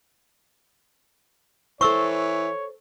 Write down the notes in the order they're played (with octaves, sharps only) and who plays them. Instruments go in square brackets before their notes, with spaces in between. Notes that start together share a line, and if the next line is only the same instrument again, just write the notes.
[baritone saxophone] E3 [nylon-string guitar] A4 C5 [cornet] C#5 [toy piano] C#6 E6